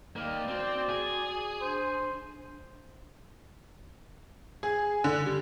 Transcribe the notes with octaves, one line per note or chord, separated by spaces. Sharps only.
D#3 A#3 D5 G5
C4 F#4 C5
G#4
D4 C5
G#4
D3
G3